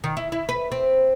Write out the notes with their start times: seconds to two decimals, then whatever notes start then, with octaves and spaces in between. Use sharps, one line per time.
0.04 D#3
0.17 E4
0.32 E4
0.49 B4
0.72 C4